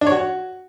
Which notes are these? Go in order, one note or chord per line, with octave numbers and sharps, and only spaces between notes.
D4
C#5
F#4